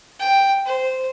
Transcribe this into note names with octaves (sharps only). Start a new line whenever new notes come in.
G5
C5